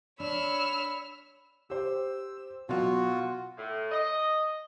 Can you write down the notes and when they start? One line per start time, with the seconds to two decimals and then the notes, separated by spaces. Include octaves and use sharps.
0.20 D4 C#5 B5 E6 F6
1.70 G4 C5 E6
2.69 B2 F#3 F4 F#4 F5
3.58 A2
3.92 D#5